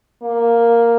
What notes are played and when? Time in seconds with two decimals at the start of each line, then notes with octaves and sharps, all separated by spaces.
0.22 A#3